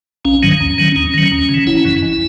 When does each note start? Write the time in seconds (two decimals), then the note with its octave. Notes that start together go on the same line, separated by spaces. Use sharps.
0.25 A#1 C#4
0.43 G#2 D#3 F#3
0.61 D#2
0.78 D#3 F#3
0.96 D#2 C#4
1.14 D#3 F#3
1.32 D#2
1.49 C#3
1.54 E3
1.67 F#1 E4
1.85 F#2 E3
2.02 G#1